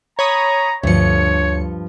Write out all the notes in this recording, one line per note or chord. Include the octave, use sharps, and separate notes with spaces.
C#5 A#5 B5 D#6
D2 G2 F3 C#5 C#7